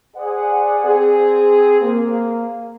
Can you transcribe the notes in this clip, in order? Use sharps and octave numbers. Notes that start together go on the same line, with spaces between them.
G#4 C5 D5 F#5
C4 G#4
A#3